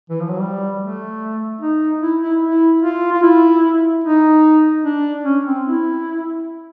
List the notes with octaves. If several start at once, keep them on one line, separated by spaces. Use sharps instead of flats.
E3
F3
F#3
G3
A3
D#4
E4
E4
E4
F4
F4
E4
D#4
D4
C#4
C4
E4